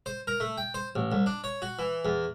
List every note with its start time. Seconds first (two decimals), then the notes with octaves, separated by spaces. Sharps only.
0.06 C5
0.27 A#4
0.40 A3
0.58 G5
0.74 C5
0.96 A1
1.12 C2
1.26 D4
1.44 C#5
1.62 F#4
1.79 E3
2.05 E2